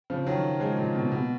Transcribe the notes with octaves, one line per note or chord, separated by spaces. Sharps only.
C#3 F3
D#3 F#3
F3 G#3
A#2
B2
B2